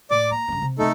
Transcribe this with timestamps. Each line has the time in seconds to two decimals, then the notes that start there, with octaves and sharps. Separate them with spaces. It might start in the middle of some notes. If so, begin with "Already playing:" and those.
0.11 A2 D5 D6
0.31 A#3 A#5
0.48 C#2 G2
0.62 C3
0.79 C3 A3 C4 D#4 A4